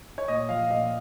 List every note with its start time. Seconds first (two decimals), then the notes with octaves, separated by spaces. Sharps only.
0.18 C#5
0.28 A#2 D#5
0.49 F3 F5
0.70 A#2 D#5